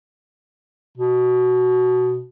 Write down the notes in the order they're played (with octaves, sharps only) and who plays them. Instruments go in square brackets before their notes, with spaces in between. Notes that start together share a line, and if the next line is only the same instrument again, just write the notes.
[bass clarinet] B2